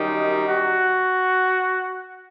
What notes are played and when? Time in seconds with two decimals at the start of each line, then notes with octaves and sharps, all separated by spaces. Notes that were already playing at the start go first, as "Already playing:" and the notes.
Already playing: F#2 D#3 G3 D#4
0.46 F#4